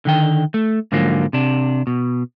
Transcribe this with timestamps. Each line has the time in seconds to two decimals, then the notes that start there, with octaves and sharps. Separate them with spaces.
0.05 D3 D#3 G5
0.54 A3
0.92 G#2 D3 F3 F#3 A#3
1.33 C3 D4
1.87 B2